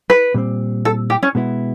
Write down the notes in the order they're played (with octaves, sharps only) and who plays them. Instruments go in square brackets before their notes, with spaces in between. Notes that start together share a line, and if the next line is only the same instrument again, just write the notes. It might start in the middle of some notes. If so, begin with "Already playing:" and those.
[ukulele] B4
[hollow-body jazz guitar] A#2 G3 C4
[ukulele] A4
G4
C#4
[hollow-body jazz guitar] B2 G#3 B3 E4